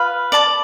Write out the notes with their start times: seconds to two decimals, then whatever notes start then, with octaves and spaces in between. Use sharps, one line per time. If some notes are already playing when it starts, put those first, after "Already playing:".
Already playing: F4 B4 F5
0.32 D5 A5 D6